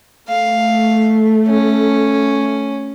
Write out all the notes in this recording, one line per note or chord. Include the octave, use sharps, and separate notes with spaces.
A3 F5
C#4